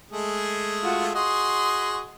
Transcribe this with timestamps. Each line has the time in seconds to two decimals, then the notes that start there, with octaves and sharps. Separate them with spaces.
0.11 G#3 A3 G#4
0.83 F4 F#4
1.15 F#4 G#4 D#5 C6